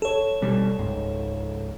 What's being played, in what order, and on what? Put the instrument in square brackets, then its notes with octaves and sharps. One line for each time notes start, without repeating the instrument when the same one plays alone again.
[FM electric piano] A4 C#5
[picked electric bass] B2 G3
C#2 G#2